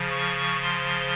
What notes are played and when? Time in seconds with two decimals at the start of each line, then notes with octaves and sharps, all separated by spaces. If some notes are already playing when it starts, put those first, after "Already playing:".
Already playing: C#3 F3
0.10 C#6
0.63 C6